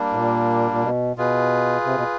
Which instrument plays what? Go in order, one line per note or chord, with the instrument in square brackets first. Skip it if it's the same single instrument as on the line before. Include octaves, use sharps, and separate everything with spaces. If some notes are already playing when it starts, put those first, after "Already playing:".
Already playing: [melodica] G3 A#3 D4
[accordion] A2
A#2
A#2
B2
[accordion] B2 [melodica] F4 G#4 B4
[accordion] C3
B2